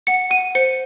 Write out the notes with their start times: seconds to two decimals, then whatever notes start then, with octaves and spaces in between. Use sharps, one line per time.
0.07 F#5 C#7
0.30 F#5 D#7
0.55 C5 C#7